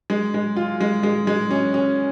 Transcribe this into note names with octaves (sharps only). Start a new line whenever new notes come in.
G#3
G#3
F4
G#3
G#3
G#3
C#4
C#4